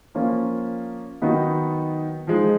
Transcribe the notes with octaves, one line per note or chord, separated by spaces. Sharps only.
F3 A#3 C#4 F4
D#3 F#3 B3 D#4
F3 G#3 D#4